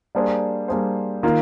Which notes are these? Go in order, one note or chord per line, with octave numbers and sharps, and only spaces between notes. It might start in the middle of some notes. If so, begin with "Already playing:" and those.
G3 A#3 D4 G#4 C5
G3 A#3 D4 G#4 C5
D#3 A#3 F4